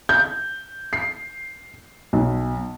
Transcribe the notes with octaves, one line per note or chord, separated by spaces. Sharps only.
G6
C7
B1